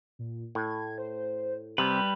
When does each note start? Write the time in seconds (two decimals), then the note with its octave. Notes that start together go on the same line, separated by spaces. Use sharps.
0.19 A#2
0.55 A2 G#6
0.98 C5
1.78 C3 G3 B4 G6